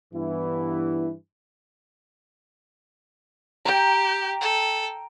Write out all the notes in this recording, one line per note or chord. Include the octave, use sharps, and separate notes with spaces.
G2 E3 B3 E4
G4 G5 A#5
A4